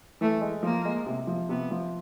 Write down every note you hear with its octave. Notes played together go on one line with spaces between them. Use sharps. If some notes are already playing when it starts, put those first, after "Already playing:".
E3 A3
G#3
F3 A#3
G#3
C3
F3
C3 B3
F3